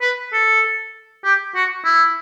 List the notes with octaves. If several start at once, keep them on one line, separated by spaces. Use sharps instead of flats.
B4
A4
G4
F#4
E4